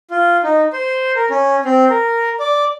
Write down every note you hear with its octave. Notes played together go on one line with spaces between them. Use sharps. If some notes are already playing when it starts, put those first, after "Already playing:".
F4
D#4
C5
A#4
C#4
C4
A#4
D5